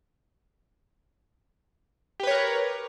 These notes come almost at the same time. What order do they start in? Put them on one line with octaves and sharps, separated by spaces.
G4 B4 C#5 A#4